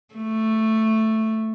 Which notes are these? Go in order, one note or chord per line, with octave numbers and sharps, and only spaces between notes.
A3